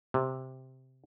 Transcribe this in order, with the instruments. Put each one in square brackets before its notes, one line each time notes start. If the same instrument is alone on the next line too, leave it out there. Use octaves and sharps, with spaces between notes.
[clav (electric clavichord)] C3